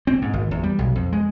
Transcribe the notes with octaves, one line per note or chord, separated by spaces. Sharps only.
C4
G#2
G#1
E2
G3
B1
F2
G#3